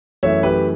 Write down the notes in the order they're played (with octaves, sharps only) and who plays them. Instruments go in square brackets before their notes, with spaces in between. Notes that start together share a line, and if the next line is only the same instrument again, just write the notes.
[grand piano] F#2 E3 A3 C#5 E5
G4 B4